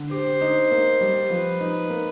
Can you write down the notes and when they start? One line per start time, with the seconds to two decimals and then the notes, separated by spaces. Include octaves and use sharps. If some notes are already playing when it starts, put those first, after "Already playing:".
Already playing: D3
0.10 G4 C5
0.41 D#4
0.71 A#3
1.01 G3
1.30 F3 B4
1.60 D#4
1.90 A#3